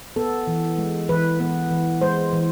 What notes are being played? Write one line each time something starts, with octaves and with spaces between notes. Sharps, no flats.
B3 A4
E3
G#3
E3 B4
B3
E3
G#3 C5
E3